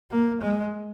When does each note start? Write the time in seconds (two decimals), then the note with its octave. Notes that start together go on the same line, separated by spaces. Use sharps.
0.11 A#3
0.41 G#3